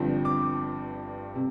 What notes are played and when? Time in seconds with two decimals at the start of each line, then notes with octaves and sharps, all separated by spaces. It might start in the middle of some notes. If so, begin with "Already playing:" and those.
Already playing: G1 G2 F3 C4
0.25 D6
1.35 C3